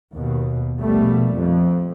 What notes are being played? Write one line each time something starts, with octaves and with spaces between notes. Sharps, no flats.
D#2 B2
A#1 B2 G3 A3
F2